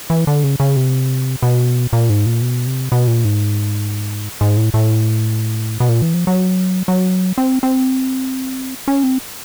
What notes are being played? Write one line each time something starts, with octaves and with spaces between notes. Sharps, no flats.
E3
D3
C#3
C#3
C3
B2
A#2
G#2
A#2
B2
C3
B2
A#2
G#2
G#2
A2
A2
B2
A#2
E3
F3
F#3
F#3
C4
C4
C#4
C4